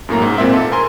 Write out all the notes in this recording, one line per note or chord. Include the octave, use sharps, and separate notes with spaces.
F#2 A2 A#3 A#5
G#2
A#2 C4 E5
A4
A#4 G#5 C6